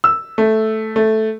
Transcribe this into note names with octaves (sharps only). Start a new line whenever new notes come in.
E6
A3
A3